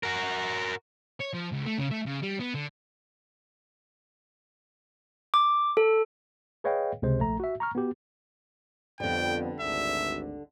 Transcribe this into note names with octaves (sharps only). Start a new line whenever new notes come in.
F#4 A#4
C#5
F3
C#2
A3
C#3
A3
C#3
G3
B3
D3
D6
A4
G#4 B4 C#5 D#5 F5 G5
C#2 C3 G#3 C5
A#1 A3 A#5
F#4 E5
A#5 C#6 F6
B3 F#4 G4
F2 D3 G3 B3 G5
G#1 D2 D4 E5